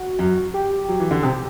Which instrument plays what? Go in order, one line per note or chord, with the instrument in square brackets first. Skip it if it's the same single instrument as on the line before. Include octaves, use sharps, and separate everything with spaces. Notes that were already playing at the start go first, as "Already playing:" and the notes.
Already playing: [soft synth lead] F#4
[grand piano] F#2
[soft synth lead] G4
[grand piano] F#3
E3
D3
[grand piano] C3 [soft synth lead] G4